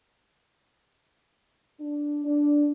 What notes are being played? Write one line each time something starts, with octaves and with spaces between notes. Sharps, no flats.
D4
D4